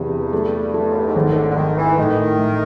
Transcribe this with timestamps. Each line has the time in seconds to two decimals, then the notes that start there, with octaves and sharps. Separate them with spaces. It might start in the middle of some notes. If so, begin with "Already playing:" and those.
Already playing: E2 G2 C3
0.33 A3
0.74 A3
0.91 F#2
0.99 G2
1.07 G#2
1.15 G#1 A2
1.28 D#3
1.36 D3
1.51 D3
1.57 G#1 D#3
1.77 E3
1.98 A2 D#3
2.39 A2